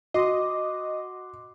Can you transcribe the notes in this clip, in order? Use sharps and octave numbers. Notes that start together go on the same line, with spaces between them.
F#4 D#5 C6 D6 C7